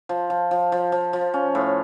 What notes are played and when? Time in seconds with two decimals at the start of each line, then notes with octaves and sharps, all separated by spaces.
0.09 F3
0.30 F3
0.51 F3
0.72 F3
0.92 F3
1.13 F3
1.34 C#4
1.55 A2